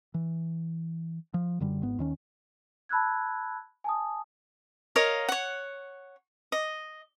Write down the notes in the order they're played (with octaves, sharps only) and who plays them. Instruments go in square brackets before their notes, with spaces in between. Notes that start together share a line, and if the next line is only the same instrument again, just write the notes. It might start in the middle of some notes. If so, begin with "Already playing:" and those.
[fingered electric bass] E3
F3
F#2 D3 G3
G#1 G#2 B3
D#2 D#3 C#4
[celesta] A5 B5 E6 F#6 G#6
G#5 A5 D#6
[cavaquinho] A#4 C#5 D#5 F5
C#5 F#5
D#5